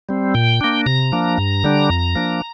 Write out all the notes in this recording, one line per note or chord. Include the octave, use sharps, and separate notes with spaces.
G3 C4
A#2 G5
A#3 D4
C3 A#5
F3 A#3 D4
G2
D3 G3 D4
F2
F3 A#3 D4